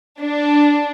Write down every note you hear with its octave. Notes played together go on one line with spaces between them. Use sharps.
D4